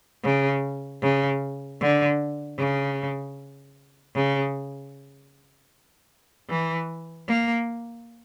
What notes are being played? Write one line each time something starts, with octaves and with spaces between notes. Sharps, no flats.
C#3
C#3
D3
C#3
C#3
E3
A#3